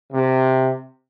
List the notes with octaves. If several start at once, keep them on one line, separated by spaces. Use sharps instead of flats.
C3